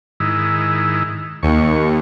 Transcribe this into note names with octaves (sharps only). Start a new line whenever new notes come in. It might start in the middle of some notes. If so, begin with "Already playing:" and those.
G#2 D#3 E4
D#2 C#6